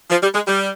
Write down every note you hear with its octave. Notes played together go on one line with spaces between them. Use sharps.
F3
G3
G#3
G3